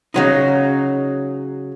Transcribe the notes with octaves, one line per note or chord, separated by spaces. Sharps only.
C#3 F#3 D#4